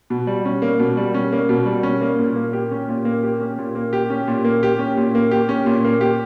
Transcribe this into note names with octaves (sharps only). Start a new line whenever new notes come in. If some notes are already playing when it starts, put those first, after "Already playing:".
B2
G3
C#4
A#3
B2
G3
C#4
A#3
B2
G3
C#4
A#3
A#2
A#3
G4
C#4
A#2
A#3
G4
C#4
A#2
A#3
G4
C#4
A#2
A#3
G4
C#4
A#2
A#3
G4
C#4
A#2
A#3
G4